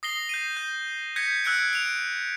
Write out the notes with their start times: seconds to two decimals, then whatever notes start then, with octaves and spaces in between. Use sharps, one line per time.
0.03 D#6 A#6 C7 G7
0.29 G6 C7 D#7
0.57 G6
1.16 G6 G#6 A#6 B6 C#7
1.44 E6 F#6 G#6 C#7 D7
1.73 D7 F7